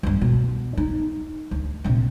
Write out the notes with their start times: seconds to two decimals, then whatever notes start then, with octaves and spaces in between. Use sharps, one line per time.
0.03 E2 G2
0.21 B2
0.77 D#4
1.51 D2
1.84 A#1 C3